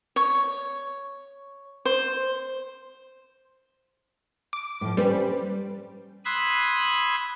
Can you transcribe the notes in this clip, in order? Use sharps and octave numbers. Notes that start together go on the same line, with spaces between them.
C#5
C5
D6
A2 F3
G3 C#4 B4 C5
B5 C6 D#6 E6 F#6 G#6